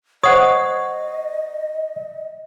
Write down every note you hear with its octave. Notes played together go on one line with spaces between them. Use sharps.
C5 C#5 D#5 F#5 D#6